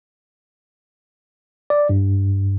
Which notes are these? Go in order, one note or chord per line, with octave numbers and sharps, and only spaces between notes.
D5
G2